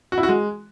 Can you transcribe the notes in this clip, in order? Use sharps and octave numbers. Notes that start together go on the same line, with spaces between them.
F#4
E4
F#4
G#3